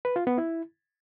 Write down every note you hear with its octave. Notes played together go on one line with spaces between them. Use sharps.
B4
F4
B3
E4